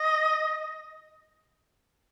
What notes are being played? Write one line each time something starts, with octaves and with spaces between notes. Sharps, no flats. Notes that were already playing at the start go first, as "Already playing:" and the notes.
Already playing: D#5